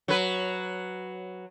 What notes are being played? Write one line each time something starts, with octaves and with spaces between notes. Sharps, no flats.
F#3 B4